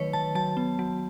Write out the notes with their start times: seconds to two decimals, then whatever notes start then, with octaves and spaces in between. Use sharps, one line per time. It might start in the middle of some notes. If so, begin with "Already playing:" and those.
Already playing: D#3 F#3 A3 B4 C#5
0.13 D#3 A5
0.35 F#3 A5
0.57 B3
0.79 F#3